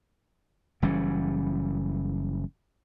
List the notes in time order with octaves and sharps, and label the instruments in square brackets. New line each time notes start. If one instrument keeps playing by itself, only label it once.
[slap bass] F#1 E3 G3 C#4